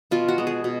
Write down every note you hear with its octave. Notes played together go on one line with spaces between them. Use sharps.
B2 F4
F#4
G#3 B3
G#4
B2